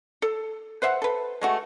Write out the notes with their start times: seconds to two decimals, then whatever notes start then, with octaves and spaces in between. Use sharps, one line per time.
0.22 A4
0.82 B4 C5 E5 F#5
1.02 A4 B4
1.42 G#3 A3 F#4